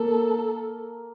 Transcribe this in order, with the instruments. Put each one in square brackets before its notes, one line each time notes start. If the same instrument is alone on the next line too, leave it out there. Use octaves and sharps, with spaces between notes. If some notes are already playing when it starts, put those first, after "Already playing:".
Already playing: [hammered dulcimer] A#3 [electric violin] A4